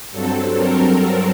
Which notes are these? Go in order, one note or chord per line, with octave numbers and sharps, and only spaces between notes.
G2 F#3 C4 A4
A#4
A#4